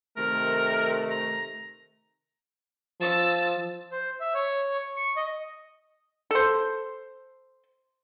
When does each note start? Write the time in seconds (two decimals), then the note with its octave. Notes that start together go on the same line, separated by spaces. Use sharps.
0.17 C3 D#3 A3 A#4
1.10 A#5
3.01 F3 E6 A6
3.92 C5
4.20 E5
4.35 C#5
4.96 C#6
5.16 D#5
6.31 A4 C5